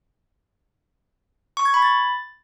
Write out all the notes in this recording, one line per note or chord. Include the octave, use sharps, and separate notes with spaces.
C#6
G#6
B5
A6